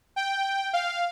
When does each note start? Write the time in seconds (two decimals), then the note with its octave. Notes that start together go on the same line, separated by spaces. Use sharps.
0.16 G5
0.73 F5